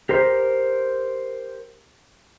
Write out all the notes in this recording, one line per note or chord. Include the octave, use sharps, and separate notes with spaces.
G4 A#4 C5